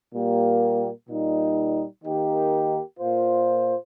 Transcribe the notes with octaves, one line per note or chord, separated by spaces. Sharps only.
A#2 G3 A#3 G4
A#2 G3 D#4
D#3 A#3 D#4 G4 A#4
A#2 A#3 F4 C5